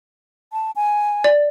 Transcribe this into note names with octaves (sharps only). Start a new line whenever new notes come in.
A5
G#5
D5